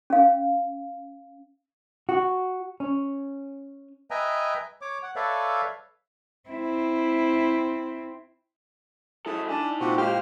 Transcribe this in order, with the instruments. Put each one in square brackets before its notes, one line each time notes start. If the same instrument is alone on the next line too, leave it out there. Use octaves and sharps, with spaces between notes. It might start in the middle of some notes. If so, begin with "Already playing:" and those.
[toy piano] C#4 F5
[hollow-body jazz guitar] F#4
C#4
[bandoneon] B4 D#5 E5 G5 G#5 A#5
C#5 D6
F#5
A4 B4 C#5 D5 E5 F5
[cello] C4 E4
[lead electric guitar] F#2 A4 [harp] E4 [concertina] G#4
[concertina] D4 [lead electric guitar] D#4 G#5 [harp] A5
[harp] A#2 [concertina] C4 F#4 G4
[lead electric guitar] G#3 F5 [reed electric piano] G4 [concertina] C5 F6